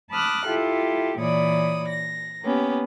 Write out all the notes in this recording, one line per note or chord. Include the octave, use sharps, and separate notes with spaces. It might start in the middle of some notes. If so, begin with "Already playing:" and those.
A5 B5 D6 D#6 F6 F#6
E4 F4 G4 A4
A#2 E3 C#5 D5 B5 D#6
A#6
A#3 B3 C#4 G4